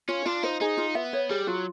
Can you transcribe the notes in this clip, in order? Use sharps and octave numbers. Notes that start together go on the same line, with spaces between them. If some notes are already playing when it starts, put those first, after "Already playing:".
C#4 F4
D4 F4
D#4 C5
D#4 G#4
F4
B3 E5
C#5
G3 G#4
F#3 F4